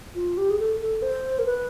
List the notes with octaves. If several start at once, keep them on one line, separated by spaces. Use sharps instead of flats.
F4
G4
G#4
A4
A4
C5
A#4
B4